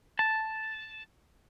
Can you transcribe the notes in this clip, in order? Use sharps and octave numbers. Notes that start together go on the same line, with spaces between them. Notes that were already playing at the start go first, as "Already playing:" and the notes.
A5